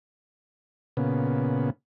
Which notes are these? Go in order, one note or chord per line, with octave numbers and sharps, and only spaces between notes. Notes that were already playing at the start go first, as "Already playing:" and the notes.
A#2 C#3 B3